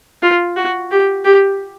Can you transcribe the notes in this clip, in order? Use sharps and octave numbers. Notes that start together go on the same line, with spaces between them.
F4
F#4
G4
G4